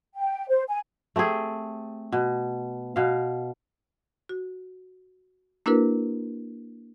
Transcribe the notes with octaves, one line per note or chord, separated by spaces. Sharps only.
G5
C5
G#5
A3 C4 G4 G#4
B2
B2 F5
F#4
A#3 D4 E4 F#4 A#4 B4